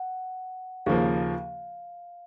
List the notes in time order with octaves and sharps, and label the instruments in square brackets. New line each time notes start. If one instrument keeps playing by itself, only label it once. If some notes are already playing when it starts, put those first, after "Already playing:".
Already playing: [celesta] F#5
[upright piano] D#2 C#3 F3 A#3 [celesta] F5